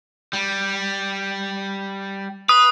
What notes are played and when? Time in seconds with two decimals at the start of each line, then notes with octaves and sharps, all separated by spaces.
0.33 G3
2.49 B4 D#6